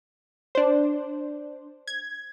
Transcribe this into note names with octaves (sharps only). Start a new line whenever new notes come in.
D4 C5
G#6